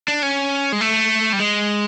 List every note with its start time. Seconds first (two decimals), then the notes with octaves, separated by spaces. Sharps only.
0.08 D4
0.23 C#4
0.72 G#3
0.81 A3
1.33 G3
1.40 G#3